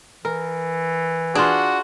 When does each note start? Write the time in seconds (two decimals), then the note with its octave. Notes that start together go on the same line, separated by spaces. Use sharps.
0.25 E3 A#4
1.35 D4 F4 F#4 G#4